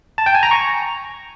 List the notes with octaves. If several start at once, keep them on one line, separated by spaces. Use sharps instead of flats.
A5
G5
G#5
A#5
C#6